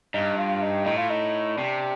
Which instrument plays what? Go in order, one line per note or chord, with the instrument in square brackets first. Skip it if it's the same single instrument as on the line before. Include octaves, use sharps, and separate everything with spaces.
[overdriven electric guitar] G2 [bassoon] D#4
[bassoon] F4
D#4
[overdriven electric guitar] A2 [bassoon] D#4
[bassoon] F4
D#4
[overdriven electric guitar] C3 [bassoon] D4